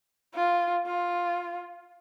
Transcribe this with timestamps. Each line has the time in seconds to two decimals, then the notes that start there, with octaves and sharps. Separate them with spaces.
0.35 F4
0.86 F4